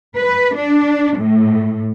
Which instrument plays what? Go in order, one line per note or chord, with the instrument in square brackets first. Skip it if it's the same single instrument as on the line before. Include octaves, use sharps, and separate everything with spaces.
[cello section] B4
D4
A2